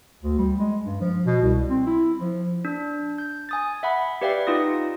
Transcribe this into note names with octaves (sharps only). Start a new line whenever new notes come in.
D2
G3
G#3
G2
F3
B2
C2
C4
E4
F3
D4
G6
G#5 D#6 A6
E5 F#5 B5
G4 B4 D5 E5 F5 G5
D#4 F4 D#6 A#6